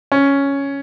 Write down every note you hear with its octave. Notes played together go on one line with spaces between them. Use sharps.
C#4